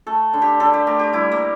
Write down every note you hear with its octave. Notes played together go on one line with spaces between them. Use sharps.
A3 A4
D3
G4
D3 A4
G4
A3 A#4
G4
G3 E4
A#3